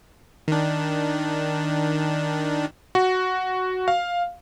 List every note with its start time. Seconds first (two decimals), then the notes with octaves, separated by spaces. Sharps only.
0.48 D#3 D4
2.95 F#4
3.88 F5